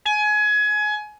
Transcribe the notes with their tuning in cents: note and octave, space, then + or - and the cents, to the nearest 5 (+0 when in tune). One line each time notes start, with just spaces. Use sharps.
G#5 +25